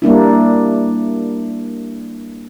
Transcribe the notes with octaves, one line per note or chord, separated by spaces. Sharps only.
G3 A#3 D4 E4